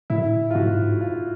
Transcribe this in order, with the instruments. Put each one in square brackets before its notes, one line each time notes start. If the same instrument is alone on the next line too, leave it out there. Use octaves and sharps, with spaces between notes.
[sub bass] A2 [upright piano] E4
[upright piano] F4
[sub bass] G#2 [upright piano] F#4
[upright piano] F4